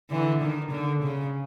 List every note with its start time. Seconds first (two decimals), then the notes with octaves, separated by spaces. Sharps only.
0.10 D3 E3
0.41 D#3
0.71 D3
1.03 C#3